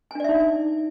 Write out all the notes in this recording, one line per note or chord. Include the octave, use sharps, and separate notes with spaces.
D4 D#4 D5 E5 G#5